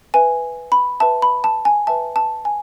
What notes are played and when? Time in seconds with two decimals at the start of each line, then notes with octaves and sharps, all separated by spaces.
0.14 B4 E5 G#5
0.72 B5
1.00 B4 E5 A5
1.22 B5
1.44 A5
1.65 G#5
1.87 B4 E5 A5
2.16 A5
2.45 G#5